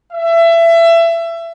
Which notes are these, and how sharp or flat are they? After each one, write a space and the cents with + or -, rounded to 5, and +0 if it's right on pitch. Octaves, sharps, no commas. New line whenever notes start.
E5 +25